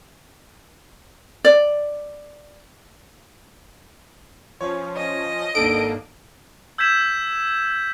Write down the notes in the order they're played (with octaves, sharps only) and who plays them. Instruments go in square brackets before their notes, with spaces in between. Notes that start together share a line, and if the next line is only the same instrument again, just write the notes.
[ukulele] D5
[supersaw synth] F3 C#4 [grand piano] C#5
[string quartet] D#5
[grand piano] G#1 D#4 A4 [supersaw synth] A#3 D4 [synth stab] D7
[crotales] E6 G6 G#6 B6 E7